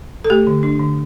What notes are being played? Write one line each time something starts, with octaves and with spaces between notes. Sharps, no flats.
A4
A3 G4
D3
D4
D3